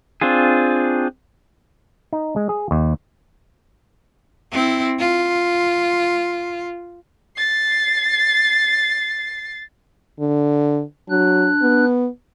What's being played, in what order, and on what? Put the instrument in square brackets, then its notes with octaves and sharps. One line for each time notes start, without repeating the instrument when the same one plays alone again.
[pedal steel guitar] C4 D4 F4 G#4
[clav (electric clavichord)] D#4
G#3
G#4
D#2
[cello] C4 E4
F4
[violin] A6 C7
[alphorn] D3
[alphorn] F#3 [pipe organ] D4 F#6
[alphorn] B3